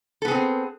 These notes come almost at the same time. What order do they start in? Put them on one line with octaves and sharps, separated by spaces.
A4 B3 G#4 C4